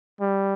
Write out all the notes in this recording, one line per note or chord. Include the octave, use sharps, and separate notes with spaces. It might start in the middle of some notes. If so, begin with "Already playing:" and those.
G3